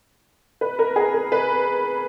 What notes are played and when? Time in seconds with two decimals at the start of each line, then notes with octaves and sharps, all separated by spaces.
0.61 B4
0.79 A#4
0.96 G#4
1.14 A#4
1.32 B4